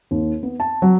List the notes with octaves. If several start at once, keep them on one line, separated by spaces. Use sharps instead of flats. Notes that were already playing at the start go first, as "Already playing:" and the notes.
D#2
B3
A5
F#3